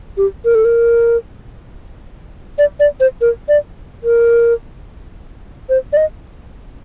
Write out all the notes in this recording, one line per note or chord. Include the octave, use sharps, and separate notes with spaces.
G4
A#4
A4
A#4
D5
D5
C5
A#4
D5
A#4
C5
D5
D#5